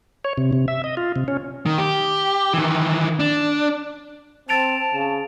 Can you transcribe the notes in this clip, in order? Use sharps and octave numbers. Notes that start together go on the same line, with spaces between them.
C#5
C3
C3
E5
D#5
F4
C3
C#4
D#3
G4
D#3 E3
D4
C4 A5 A6 D7 F7
C#3